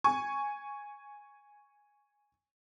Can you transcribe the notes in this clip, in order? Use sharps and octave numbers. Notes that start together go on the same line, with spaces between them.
G#5 C#6